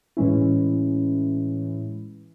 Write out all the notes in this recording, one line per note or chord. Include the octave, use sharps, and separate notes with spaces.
A2 E3 G#3 C#4 E4